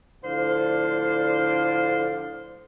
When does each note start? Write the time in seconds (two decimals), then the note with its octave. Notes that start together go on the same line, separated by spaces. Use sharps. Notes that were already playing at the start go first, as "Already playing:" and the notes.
0.23 A2 D3 F3 C5 D5 F5